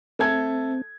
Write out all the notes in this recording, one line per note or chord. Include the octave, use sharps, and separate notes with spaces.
A3 C4 A4 G#6